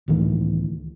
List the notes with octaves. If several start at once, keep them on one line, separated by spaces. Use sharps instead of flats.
C#2 A2 D#3 E3